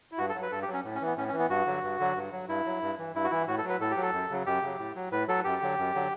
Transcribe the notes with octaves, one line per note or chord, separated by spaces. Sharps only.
E4
G2 F#4
A4
F#3
B4
G2 A4
G4
F#3
C#4
A2
C#4
E3 B3
A2 C#4
C#4
E3
B3
G2 F#4
D3 F#3
G2
D3 F#3
G2
F#3
G2 E4
F#3
G2
E3
G2 E4
F#4
E3 E4
A2 F#4
A4
F#3
B4
A2 A4
G4
F#3
A4
F#2
C#3 F#3
F#2 G4
C#3 F#3
A2
F#3
A2 B4
F#3 A4
F#2 G4
D3 F#3
F#2
D3 F#3